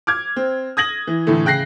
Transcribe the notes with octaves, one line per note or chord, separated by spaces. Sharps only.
D6 F6 G#6
C4
D#6 G#6 A#6 F#7
E3
A2 D3 E3 A3
C#3 G5 F#6 A#6 C7